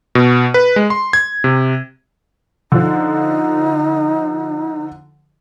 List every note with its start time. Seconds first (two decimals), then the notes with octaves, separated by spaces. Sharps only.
0.15 B2
0.54 B4
0.76 G#3
0.90 C6
1.13 G#6
1.44 C3
2.72 D3 F3 D#4